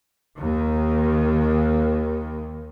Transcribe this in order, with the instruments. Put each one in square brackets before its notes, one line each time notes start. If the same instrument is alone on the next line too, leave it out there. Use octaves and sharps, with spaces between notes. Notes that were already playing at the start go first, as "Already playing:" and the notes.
[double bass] D#2 D#3